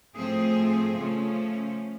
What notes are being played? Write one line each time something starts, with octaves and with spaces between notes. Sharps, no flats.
A2 F3 A3 C4 G#4
C#3 F3 A3 C#4